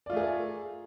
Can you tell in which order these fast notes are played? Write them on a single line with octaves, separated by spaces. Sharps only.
D5 F4 A3 G#4 A#4